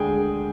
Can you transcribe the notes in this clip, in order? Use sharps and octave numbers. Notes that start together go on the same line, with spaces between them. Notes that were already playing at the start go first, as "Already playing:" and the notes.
Already playing: D2 D3 G#3 G#4 G5 G#5